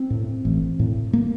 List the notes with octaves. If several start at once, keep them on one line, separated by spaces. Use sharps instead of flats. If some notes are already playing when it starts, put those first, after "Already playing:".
Already playing: C4
A2
A1
A2
A#3